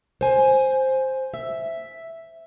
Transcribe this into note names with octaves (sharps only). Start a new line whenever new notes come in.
C5 G#5
E5